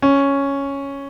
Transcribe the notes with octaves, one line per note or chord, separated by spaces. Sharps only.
C#4